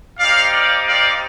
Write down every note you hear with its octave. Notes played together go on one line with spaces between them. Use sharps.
C4 D#4 G4 D5 F5
D5 F5
D5 F5